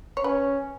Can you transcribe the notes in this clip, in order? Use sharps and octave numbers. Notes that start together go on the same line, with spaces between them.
C#5
C#4 B4